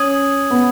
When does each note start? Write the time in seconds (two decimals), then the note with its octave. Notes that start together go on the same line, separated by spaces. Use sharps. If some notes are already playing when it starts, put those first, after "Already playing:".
Already playing: C#4 D#6 G#6 D#7 F#7
0.50 B3